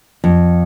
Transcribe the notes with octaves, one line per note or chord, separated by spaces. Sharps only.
F2